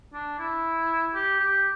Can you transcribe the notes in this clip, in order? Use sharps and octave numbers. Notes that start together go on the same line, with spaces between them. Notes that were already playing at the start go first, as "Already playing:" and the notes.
D4
E4
G4
G4